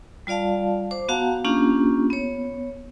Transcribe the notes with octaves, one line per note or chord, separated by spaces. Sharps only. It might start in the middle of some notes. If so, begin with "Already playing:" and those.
G3 F4 D5 F5 A5
C5 D6
B3 F#4 F5 F#5 A5 A#5
A#3 C#4 D4 F4 G4
B3 C#5